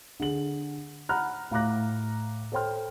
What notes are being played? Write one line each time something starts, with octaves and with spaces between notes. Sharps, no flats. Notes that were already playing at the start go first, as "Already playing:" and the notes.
D3 G#4 F#7
F#5 A#5 B5 F6 F#6
A2 F5 A#5 D6 F#6 A#6
A4 C5 C#5 G5 C6 F6